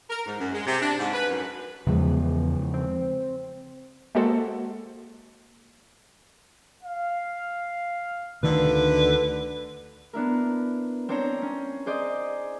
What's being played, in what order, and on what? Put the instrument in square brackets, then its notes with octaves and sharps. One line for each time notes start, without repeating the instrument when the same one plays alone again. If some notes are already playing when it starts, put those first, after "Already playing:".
[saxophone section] A#4
G#2
F#2
G#3
C3
D4
G#2
B4
F#2
[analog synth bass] E2 [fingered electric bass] C#3 F3 G#3
[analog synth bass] C4
[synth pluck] G#3 A#3 F#4 A4 C5
[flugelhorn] F5
[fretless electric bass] D2 D#3 D4 [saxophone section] D3 B4
[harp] B3 D4 E4 A#4
C4 D4 C5 C#5 A#5
C#4
G#4 C5 D5 D#5